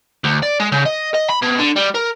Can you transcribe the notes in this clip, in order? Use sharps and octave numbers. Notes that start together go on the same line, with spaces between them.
D2
D5
G#3
C#3
D#5
D#5
B5
B2
D3
G3
A#4